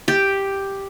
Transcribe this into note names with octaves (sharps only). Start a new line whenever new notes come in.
G4